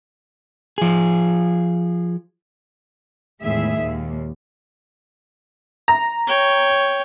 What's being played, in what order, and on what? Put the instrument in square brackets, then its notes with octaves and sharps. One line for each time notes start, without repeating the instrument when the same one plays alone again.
[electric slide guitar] F3 G#4
[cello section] E2 A2 D#3 G#3 G#4 E5
D#2 A#2
[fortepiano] A#5
[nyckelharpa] C#5 G5